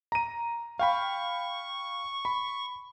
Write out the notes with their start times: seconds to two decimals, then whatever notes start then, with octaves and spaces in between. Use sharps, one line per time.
0.12 A#5 D#7
0.79 F5 G5 B5 C#6
2.25 B5